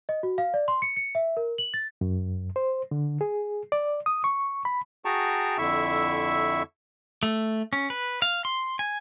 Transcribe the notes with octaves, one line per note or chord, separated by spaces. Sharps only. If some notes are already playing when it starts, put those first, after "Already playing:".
D#5
F#4
F5
D5
C6
C#7
C#7
E5
A#4
F#7
A6
F#2
C5
D3
G#4
D5
D#6
C#6
B5
F#4 G#4 G5 A5 A#5 C#6
F2 D3 E4 E5 C#6 E6
A3
C#4
B4
F5
C6
G#5